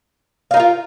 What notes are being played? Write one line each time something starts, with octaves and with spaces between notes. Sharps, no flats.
D#4 F4 A#4 F5